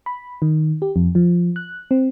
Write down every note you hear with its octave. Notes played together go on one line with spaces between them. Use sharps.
B5
D#3
G4
F2
F3
F#6
C4